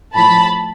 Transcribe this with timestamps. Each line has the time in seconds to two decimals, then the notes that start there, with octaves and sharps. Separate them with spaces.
0.14 A2 F3 A5 B5